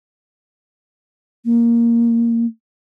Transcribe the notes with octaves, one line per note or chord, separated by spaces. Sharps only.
A#3